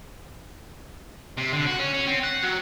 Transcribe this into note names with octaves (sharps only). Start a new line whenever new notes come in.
C3
D3
F#4
C#4
C#4
C4
F#5
F#3